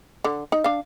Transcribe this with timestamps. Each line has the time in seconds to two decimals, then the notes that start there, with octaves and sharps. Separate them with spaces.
0.24 D3
0.52 D#4
0.64 D4 F5